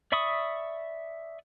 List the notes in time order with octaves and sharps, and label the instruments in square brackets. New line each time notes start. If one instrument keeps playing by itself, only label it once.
[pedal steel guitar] D5 E5 B5 C#6 D#6